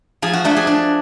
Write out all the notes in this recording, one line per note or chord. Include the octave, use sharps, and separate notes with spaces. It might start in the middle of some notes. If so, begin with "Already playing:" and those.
F3 G#4
F#4
A3 D4
G#4
D4